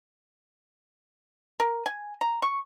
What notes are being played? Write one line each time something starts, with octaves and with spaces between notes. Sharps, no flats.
A#4
G#5
A#5
C#6